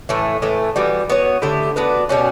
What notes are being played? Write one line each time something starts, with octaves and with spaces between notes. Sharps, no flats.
A2 E3 A3
A2 E3 A3
E3 G3 B3 F#4
B3 F#4 C#5
D3 A3 E4 G4
B3 D4 F#4 B4
B2 G3 C#4 F#4